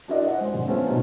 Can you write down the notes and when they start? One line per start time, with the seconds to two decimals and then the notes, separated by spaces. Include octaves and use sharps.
0.08 D4 E4 F#4 A#4 D5 D#5
0.26 D#5 E5 F#5
0.38 G#3 C5
0.54 G#1 F#2
0.68 A3 B3 C#4 D4 F4 C5
0.87 G#2 B2 B3 D#4